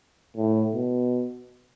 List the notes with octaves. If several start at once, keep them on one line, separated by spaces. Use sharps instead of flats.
A2
B2